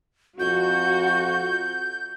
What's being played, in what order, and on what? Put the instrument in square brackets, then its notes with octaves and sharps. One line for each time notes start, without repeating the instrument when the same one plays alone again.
[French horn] F2 [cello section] F#4 [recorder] G6